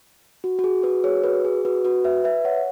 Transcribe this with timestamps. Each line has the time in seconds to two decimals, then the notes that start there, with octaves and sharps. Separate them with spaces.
0.44 F#4
0.59 F#4
0.64 G#4
0.83 F#4 B4
1.04 G#4 C#5
1.24 F#4 B4
1.45 G#4
1.65 F#4 B4
1.85 F#4 B4
2.04 B4 E5
2.24 B4 E5
2.45 C#5 F#5